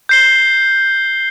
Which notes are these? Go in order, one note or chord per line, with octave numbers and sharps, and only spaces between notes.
G6 C7 G7